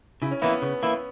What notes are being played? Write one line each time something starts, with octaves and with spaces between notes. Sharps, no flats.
C#3 E4
C#4
E3 A#3 B3 E4
C#3 B3
E3 A#3 E4